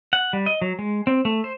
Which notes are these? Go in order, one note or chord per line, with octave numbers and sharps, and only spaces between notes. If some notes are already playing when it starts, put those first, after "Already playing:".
F#5
G3
D#5
F#3
G#3
C4
A3
C5